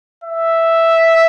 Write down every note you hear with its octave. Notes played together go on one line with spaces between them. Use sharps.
E5